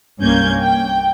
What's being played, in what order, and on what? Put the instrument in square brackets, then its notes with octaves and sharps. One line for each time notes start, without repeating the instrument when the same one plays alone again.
[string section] C2 G2 A#3 C#4 G6 G#6
G5